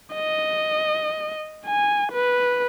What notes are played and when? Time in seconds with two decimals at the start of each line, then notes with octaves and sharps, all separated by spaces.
0.15 D#5
1.67 G#5
2.12 B4